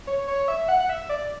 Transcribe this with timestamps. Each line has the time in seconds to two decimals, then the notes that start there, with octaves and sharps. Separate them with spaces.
0.07 C#5
0.28 C#5
0.48 E5
0.68 F#5
0.80 F#5
0.89 E5
1.09 D5